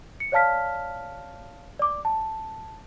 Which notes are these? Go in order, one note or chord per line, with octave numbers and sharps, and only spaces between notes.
C#7
C#5 D5 F5 A5 F6 B6
D5 D6
A5